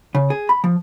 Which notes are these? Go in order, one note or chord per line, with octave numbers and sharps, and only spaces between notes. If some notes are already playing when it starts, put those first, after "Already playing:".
C#3
G#4
B5
F3